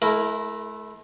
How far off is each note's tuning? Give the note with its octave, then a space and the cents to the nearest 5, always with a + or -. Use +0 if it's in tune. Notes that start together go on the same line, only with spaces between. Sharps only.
A3 -40 E4 +0 A#4 +0